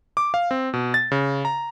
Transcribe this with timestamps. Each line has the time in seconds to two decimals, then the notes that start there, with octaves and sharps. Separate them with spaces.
0.17 D6
0.34 F5
0.51 C4
0.74 B2
0.94 A6
1.12 C#3
1.45 A#5